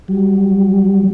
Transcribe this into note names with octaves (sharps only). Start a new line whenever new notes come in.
F#3 G3